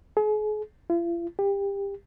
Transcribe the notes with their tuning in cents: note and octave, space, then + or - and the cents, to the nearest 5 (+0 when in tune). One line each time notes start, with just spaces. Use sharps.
G#4 +40
F4 -45
G4 +25